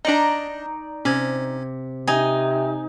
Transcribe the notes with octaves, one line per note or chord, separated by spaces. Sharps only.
D4 D#4 D5 D#5 A#5
C3 C#4 G#6
C3 D#4 G#5